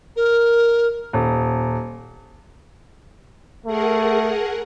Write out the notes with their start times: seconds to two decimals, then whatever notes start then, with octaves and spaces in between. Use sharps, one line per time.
0.16 A#4
1.13 D#1
3.66 A3 G#4 A#4 F#5